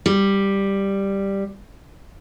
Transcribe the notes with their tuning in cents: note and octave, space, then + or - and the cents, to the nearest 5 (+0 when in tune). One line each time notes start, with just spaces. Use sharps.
G3 +5